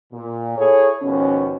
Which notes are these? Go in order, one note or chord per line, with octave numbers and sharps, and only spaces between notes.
A#2
E4 G#4 A4 C#5
D#2 B2 F3 C#4